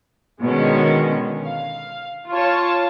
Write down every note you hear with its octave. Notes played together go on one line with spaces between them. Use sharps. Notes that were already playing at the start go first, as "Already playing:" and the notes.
B2 D3 D#3 G#3 C#4
F5
F4 C#5 A5